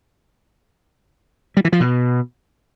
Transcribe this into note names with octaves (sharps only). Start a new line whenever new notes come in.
G3
E3
F3
B2